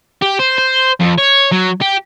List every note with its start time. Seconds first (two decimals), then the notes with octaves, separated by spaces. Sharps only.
0.22 G4
0.39 C5
0.58 C5
1.00 F2
1.18 C#5
1.52 F#3
1.82 G4